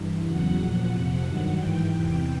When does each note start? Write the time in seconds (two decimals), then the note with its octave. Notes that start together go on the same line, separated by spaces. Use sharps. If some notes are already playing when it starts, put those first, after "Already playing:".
Already playing: G2 E3
0.24 E2 C#3 F#3 F#5
0.57 A#2 F3
0.90 F2 C3 F3 F#5
1.24 G2 D#3 F#3
1.57 G#2 E3 G5
1.91 E2 C3 E3